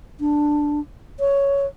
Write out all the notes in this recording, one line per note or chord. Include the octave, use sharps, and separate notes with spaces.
D4
C#5